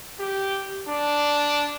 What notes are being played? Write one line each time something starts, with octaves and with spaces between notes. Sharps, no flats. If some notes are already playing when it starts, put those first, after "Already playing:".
G4
D4